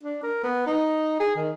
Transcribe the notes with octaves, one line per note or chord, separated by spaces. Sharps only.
D4
A#4
B3
D#4
G#4
D#3